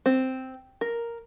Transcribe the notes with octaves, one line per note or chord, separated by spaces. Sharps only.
C4
A#4